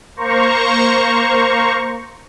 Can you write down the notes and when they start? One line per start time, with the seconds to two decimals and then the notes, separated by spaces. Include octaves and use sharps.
0.16 A#3 C5 A#5 C#6